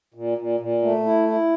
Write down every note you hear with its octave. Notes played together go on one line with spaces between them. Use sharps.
A#2
A#2
A#2
A3
E4
E4